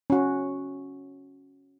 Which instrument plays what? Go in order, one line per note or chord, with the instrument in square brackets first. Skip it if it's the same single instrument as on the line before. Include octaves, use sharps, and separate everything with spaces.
[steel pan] C#4 F#4